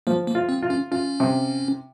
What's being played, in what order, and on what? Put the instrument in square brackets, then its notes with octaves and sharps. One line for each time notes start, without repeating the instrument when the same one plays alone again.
[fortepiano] F3 [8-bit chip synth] A#3
[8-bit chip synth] A#3
[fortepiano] F4
[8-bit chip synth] C4
[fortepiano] F4
[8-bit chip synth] C#4
[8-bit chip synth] C#4 [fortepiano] F4
[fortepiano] C3